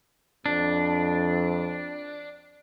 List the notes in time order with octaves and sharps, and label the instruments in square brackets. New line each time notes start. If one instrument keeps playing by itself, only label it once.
[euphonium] F2 [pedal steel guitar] D4